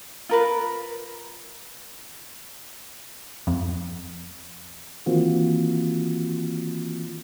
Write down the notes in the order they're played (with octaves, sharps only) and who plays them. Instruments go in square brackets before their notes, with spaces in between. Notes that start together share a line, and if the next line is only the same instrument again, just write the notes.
[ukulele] F4 A#4 B4
[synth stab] F2
[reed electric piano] D#3 E3 A#3 C4 F4 F#4